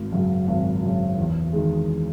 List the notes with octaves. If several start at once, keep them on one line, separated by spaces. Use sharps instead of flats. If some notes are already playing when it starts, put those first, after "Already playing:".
Already playing: G#1
F#2 C#3
G#1
F#2 C#3
E2
D#3 G#3